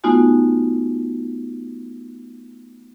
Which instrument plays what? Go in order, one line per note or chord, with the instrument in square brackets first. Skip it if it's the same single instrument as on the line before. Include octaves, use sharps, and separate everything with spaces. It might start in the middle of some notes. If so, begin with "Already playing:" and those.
[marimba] A3 B3 D#4 F4 F#4 G#5